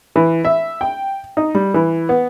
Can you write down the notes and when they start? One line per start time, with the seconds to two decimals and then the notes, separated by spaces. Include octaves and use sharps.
0.16 E3
0.45 E5
0.81 G5
1.37 D#4
1.55 G3
1.74 E3
2.09 B3